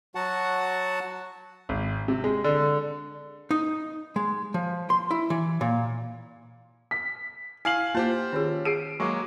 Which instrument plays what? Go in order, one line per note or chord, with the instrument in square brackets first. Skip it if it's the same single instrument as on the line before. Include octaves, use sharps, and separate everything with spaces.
[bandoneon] F#3 F#4 F#5 A5
[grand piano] G#1
C3
G#3
D3
[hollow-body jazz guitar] D#4
G#3
F3
C6
E4
E3
A#2
[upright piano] B6
[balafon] E4 [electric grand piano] F5 G#5 [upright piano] F6 C7 F#7
[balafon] A#3 [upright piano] F4 [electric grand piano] G4 C5 A5
[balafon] D#3 G#4 [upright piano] C#4
[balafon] G#4 [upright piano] C7 D7 D#7
[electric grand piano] F#3 G#3 A#3 [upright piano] C#6 D6